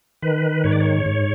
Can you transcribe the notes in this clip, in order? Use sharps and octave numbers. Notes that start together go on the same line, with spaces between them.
D#3 B4
G#2 C#5
D5
C#5
G#2